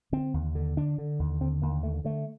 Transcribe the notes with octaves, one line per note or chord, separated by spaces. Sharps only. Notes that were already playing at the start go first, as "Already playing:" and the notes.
D3 C4
D#2
D3
D3 D4
D3
D#2
D3 C4
D#2 A#3
D3 A3
D3 A3